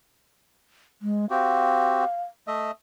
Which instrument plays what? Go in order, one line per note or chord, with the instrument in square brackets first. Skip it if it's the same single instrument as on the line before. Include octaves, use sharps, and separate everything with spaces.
[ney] G#3
[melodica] C4 F#4 G4 [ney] F5
[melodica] A3 D#5 E5